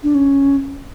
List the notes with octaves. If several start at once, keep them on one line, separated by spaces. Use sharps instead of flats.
D4
C#4